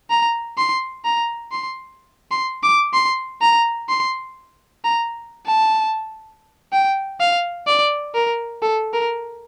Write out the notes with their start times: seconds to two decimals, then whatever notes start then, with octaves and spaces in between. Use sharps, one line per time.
0.10 A#5
0.58 C6
1.05 A#5
1.52 C6
2.31 C6
2.63 D6
2.94 C6
3.41 A#5
3.89 C6
4.84 A#5
5.47 A5
6.73 G5
7.21 F5
7.67 D5
8.15 A#4
8.62 A4
8.94 A#4